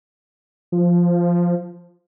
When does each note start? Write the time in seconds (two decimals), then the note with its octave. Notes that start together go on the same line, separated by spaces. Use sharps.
0.72 F3